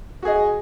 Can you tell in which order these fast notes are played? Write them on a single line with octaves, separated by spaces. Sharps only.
F#4 G#4 D#5